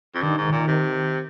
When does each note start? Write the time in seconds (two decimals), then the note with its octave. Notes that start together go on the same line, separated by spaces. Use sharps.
0.15 F2
0.22 G2 D#3
0.38 G#2
0.52 A#2 D#3
0.67 C3